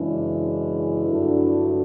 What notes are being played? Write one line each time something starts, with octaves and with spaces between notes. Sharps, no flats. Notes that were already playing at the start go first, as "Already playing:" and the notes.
Already playing: F#2 C#3 E3 G#3 D4 E4
G2 D3 F#3 A3